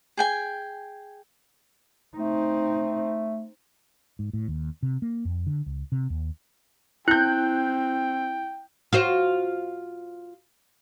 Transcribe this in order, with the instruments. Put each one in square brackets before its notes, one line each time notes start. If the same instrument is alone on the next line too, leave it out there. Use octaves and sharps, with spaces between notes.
[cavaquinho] G#4 G5 G#5
[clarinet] A3 [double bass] C4 D#4
[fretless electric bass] G#2
A2
D#2
C3
A#3
F2
D3
C#2
C3
D#2
[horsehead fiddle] C4 [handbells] E4 [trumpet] G5 [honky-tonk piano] F#6 G6
[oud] F4 F#4 C5